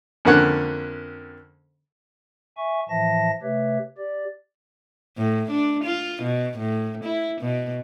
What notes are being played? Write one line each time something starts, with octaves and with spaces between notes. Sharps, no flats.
F2 D3 A#3 C#4 F#5 F#6
E5 G#5 C#6
A2 E3 F3 E5 A5 A#6
C3 A3 G4 B4 C#5 E5
G4 D5
A2
D4
F4
B2
A2
E4
B2